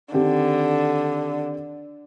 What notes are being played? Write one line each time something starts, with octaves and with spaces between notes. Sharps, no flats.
D3 D#3 C4 G4